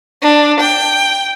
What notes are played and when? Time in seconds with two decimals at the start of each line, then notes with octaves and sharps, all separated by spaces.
0.22 D4
0.60 G5